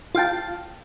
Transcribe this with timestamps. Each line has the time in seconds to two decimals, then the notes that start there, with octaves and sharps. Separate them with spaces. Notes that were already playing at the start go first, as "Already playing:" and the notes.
0.15 F4 F5 G5 A5